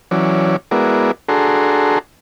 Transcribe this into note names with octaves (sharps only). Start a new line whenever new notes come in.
E3 F#3 C#4 D5
G#3 B3 E4 F#4 A#4 D5
D4 F#4 G#4 A4 A#5 C6